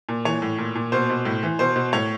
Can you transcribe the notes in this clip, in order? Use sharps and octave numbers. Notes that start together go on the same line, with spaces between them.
A#2
E3 C#5
A2
A#2
A#2
B2 C5
B2
A2
E3
B2 C5
B2
A2 C#5